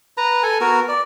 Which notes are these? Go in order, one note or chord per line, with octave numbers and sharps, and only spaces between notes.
B4 A#5
A4 G#5
B3 F#4 A#4
D5